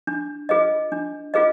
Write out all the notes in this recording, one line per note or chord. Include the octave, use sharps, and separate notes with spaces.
D4
F4 G#4 B4 D#5
D4
F4 G#4 B4 D#5